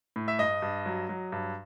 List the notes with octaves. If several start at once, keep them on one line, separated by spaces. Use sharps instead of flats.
A2
E5
G2 D#5
G2
F#3
F#3
G2